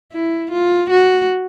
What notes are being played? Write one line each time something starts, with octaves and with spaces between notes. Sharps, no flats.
E4
F4
F#4